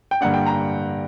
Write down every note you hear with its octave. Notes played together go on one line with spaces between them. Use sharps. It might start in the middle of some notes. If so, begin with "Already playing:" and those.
G5
G2 D3 A#3 D4 F#5
G5
A#5